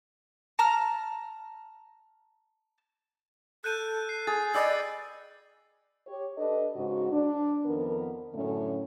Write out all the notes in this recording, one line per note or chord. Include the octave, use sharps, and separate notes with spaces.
A5 A#5 F6
A4 F#6 G6 D#7
C7
G#4 A6
B4 D5 D#5 G5 E6
G4 C#5
D4 G4 A4 B4 D#5
G#2 C#3 F#4
D4
F2 D#3 B3 A#4
F#2 A2 D3 A3 C#4